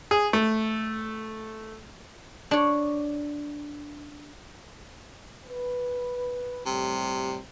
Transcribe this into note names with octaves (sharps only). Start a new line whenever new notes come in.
G#4
A3
D4 C#5
B4
A2 C3 G3